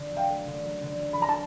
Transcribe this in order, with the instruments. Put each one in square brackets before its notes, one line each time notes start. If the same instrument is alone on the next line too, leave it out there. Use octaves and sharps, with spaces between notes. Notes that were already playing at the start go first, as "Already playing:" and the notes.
Already playing: [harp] D3
F#3
[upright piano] F5 G5
[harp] A3
D3
F#3
D3
F#3
[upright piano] B5
[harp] F#3 [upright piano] A#5
[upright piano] A5